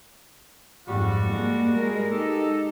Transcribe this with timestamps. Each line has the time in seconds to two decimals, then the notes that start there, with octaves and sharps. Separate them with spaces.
0.88 F2 G#2 G3 F#4
1.30 G#3 A#3
1.74 G#3 A#4
2.12 D#4 G4 A4